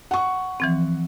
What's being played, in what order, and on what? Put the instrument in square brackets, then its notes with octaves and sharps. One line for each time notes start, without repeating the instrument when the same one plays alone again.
[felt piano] F#5 C#6
[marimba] E3 F3 C4